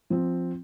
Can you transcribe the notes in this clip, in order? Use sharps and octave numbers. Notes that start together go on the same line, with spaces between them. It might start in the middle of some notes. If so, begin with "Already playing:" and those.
F3 C4